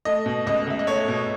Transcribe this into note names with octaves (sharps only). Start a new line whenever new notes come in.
A3 D#5
B2
C#2 D#5
C#2 E5
D#5
A3 C#5
B2